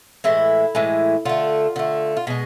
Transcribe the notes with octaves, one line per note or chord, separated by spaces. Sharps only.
A2 E3 G#3 E4
A2 E3 G#3
D3 A3 F4
D3 A3
F4
B2 G#3 G#4